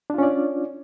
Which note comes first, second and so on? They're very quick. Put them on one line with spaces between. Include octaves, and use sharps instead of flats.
D4 F4 C#4 D5